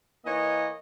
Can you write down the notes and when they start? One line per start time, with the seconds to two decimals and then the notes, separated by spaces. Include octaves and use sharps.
0.25 E3 A#3 C#5 D#5